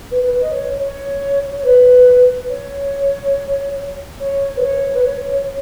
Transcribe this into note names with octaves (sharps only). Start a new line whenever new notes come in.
B4
B4
D#5
C#5
C#5
C#5
B4
C#5
C#5
B4
C#5
B4
C#5
C#5